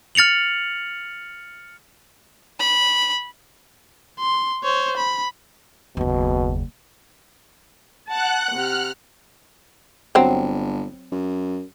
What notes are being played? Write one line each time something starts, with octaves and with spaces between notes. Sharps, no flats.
F6 A6 C#7 F7 F#7
B5
C6
C5 C#5
B5
F#1 D#2 B2
F#5 A5 F#6
C3 F6 F#6
G1 F#3 C4
F#2